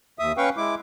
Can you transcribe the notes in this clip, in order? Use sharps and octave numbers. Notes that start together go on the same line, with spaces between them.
D#2 E5 D#6
C#4 B4 F5 G5 C#6
G#3 E4 D6